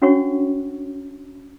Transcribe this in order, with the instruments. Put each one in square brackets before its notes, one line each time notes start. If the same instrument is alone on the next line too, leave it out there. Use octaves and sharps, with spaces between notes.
[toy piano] C#4 D4 F#4 C#5 F#5 C#6